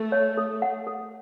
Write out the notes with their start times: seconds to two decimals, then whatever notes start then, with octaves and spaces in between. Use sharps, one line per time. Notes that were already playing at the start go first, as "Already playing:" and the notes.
Already playing: A3
0.12 C#5
0.37 A4
0.62 F#5
0.87 A4